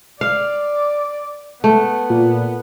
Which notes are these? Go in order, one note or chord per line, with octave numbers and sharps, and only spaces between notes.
D5 F5
A3 B3
A#2